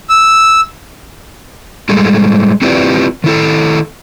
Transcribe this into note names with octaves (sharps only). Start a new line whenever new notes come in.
E6
A2 G3 G#3 G#4 A4
C4 E4 F4 G4 B4 D5
D#3 E4 A4